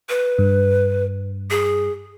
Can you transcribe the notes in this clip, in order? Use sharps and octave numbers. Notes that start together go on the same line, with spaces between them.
B4
G2
G#4